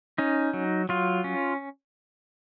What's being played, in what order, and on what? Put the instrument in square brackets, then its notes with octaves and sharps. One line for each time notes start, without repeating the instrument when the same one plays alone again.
[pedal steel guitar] C#4 D#4
F#3
F#3 F4
C#4